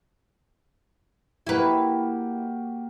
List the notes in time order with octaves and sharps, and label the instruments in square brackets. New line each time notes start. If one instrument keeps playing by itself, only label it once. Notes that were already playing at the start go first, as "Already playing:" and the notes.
[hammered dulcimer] A#3 F#4 G4 [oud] E4 B4